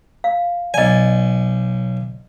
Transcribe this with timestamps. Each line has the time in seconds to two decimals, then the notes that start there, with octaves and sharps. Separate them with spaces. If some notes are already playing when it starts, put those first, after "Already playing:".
0.24 F5
0.74 B1 D5 D#5 G#5